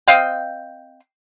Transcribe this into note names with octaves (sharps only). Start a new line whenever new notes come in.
C4 D#5 F5 G5